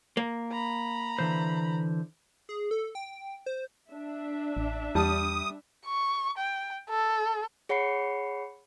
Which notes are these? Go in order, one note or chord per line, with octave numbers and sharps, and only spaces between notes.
A#3
A#5 B5
D3 E3 C5
G#4
A4
G5
C5
D4 E5
A1
E2 G3 A5 D#6
C#6
G5
A4
G#4 C#5 F#5 B5 C7 C#7